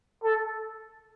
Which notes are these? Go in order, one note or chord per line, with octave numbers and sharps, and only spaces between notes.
A4